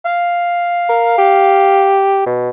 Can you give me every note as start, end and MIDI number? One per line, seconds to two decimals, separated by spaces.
0.05 2.00 77
0.89 1.14 70
1.18 2.25 67
2.26 2.50 47